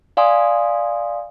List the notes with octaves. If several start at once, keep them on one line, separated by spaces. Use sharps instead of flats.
D5 F5 G#5 C6 D#6